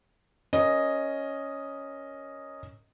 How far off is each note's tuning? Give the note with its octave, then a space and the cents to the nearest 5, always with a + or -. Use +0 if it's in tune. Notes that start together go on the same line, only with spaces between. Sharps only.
C#4 +0 A#4 +0 D#5 +0